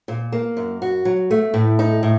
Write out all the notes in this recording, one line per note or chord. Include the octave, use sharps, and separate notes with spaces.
A#2
A#3
F#2
F#4
F#3
A3
A2
D#4
A2